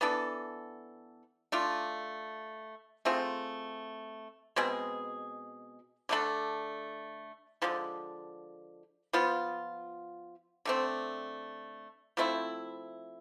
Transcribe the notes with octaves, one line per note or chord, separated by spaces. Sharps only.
E3 B3 D4 A4
A3 D4 F4
A3 C4 F4 G#4
B2 G#3 C4 G#4
D3 A3 D4 A4
D3 F3 G#3
F3 B3 F4
D3 A3 C4
F3 A3 C4 E4